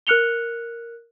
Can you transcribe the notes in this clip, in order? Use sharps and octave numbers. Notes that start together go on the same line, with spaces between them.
A#4 F6 F#6 C#7 F7 G7